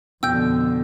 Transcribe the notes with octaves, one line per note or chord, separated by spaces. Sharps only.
F2 B2 D3 G5 E6 G6